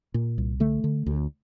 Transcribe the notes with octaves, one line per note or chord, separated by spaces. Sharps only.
A#2
C2
D3 A3
D3
D2